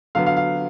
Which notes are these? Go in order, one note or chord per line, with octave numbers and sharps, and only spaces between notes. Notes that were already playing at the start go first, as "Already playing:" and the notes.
D3 F#3 B3 F5
F5
F5